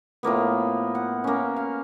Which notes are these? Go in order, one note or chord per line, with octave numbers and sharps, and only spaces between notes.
A2 F3 A#3 B3
F#5
A#3 C#4
F5